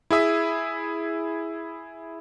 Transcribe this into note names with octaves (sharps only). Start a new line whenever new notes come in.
E4 G#4 E5 D#6